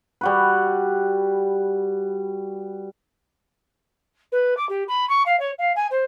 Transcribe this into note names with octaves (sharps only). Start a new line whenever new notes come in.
G3 F#4 B4
B4
D6
G4
B5
C#6
F5
C#5
F5
G#5
C5